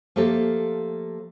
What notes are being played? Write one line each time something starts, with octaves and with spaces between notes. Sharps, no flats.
F3 A3 A#3 G4 A4